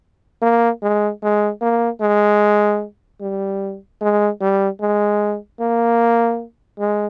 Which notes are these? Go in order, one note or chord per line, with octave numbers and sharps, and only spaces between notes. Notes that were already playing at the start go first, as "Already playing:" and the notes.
A#3
G#3
G#3
A#3
G#3
G3
G#3
G3
G#3
A#3
G#3